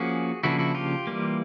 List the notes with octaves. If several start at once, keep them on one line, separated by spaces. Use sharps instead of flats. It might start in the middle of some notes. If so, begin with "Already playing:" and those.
Already playing: F3 A#3 C#4 F#4 G#4
C#3 F3 A#3 D4 E4 F#4
E4 F#4
F4 G4
E3 G3 A#3